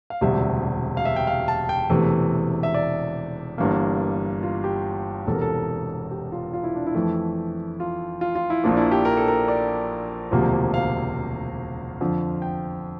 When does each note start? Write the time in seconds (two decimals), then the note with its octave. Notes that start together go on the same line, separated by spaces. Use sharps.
0.10 F5
0.21 E1 D2 C3 G3 E5
0.97 F5
1.05 E5
1.16 G5
1.27 F5
1.48 A5
1.69 G5
1.90 E1 E2 C3 E3 A3
2.63 E5
2.74 D5
3.58 G1 G2 E3 A#3
4.43 F4
4.64 G4
5.26 E1 E2 C3 A4
5.34 A#4
5.42 A4
6.11 G4
6.32 F4
6.53 F4
6.64 E4
6.76 D4
6.87 E4
6.95 F2 E3 A3
7.80 F4
8.21 F4
8.35 F4
8.50 E4
8.64 A#1 A#2 F3 A#3 D4
8.77 E4
8.91 G4
9.05 A#4
9.17 A4
9.28 A#4
9.48 D5
10.32 E1 D2 C3 F3 A#3
10.74 F5
12.01 F2 D3 F3
12.42 G5